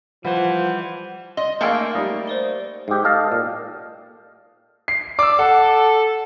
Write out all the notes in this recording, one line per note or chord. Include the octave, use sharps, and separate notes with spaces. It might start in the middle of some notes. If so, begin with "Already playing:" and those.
E3 F3 G3 C5 F#5
D#5 C6
A3 A#3 G#4 F5 G5
G3 D#4
C5 D5 G7
G#2 G4
A4 D#5 F5
A#2
C7
D5 D6 E6
A4 F#5